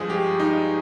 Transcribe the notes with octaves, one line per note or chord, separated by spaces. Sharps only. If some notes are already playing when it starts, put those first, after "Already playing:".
Already playing: G2 F3 G#3 G#4
G4
D#4